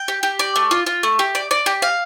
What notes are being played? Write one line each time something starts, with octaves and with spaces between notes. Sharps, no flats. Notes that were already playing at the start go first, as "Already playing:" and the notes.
Already playing: G5
G4
G4
D5
A3
F4
F4
A3
G4
D5
D5
G4
F5